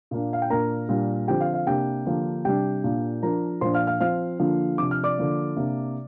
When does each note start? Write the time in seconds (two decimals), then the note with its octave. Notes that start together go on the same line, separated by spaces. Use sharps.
0.11 A#2 A#3 D4
0.33 F5
0.42 G5
0.50 A#2 A#3 D4 A#4 A#5
0.89 A#2 G3 D4
1.28 D3 F3 C4 G4 G5
1.41 F5
1.54 F5
1.67 C3 A#3 D4 G4 G5
2.06 D3 F3 A#3 D4
2.45 C3 G3 D4 G4 G5
2.84 A#2 A#3 D4
3.23 F3 D4 A#4 A#5
3.61 A#2 F3 D4 C5 C6
3.74 F5 F6
3.87 F5 F6
4.00 F3 C4 F5 F6
4.39 D3 F3 A#3 D4
4.78 C3 F3 D4 D6
4.91 F6
5.03 D5 D6
5.18 D3 F3 A#3
5.56 C3 A#3 D4